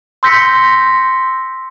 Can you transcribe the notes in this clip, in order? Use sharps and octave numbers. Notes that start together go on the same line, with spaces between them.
C6 E6 G6 A#6 B6 C#7